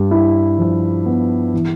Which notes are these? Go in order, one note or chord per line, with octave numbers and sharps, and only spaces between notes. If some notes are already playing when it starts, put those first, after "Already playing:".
Already playing: G2
E4
F3
B3
E3